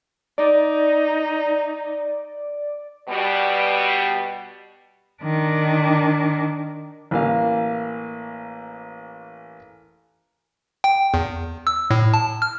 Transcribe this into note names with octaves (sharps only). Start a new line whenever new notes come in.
D#4 D5
B2 G3
D#3 D4
A1 E3 A#3 F5
G5
E2
E6
A2
A5
F6